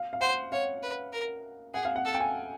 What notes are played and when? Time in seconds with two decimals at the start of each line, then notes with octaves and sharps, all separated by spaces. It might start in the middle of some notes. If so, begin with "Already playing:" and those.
Already playing: F5
0.13 F5
0.21 C5 F#5
0.52 C#5 F5
0.83 B4
1.13 A#4
1.74 G#4 F#5
1.85 F5
1.96 F#5
2.05 A4
2.14 G5
2.20 G#5